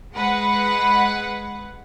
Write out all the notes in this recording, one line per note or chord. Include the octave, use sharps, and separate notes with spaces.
G#3 B4 F#5